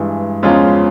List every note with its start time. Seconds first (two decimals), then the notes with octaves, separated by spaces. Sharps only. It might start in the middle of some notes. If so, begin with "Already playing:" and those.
Already playing: G2 E3 G#3
0.43 E2 C#3 F3 G#3 C#4 F4